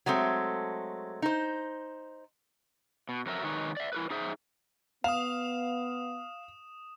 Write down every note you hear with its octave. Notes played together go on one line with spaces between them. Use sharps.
F#3 G#3 A3 C4
D#4 C5
B2
F2 F#3 A#4 E5
D#3 G#3 D#4 B4 C#5
D5 E5
E4 A#4 B4
D#4 G#4 C5 E5
B3 F5 D#6 E7